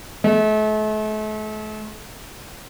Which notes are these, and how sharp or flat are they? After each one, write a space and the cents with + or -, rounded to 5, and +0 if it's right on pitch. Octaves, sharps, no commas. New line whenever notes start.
A3 -40